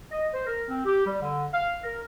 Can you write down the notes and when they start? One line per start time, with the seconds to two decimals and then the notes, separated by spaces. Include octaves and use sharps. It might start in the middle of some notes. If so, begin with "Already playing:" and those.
0.12 D#5
0.34 C5
0.47 A#4
0.69 C4
0.85 G4
1.06 G3
1.22 D3
1.52 F5
1.83 A#4